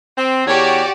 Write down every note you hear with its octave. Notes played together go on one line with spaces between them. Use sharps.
C4
E2 F#4 G4 C#5 D5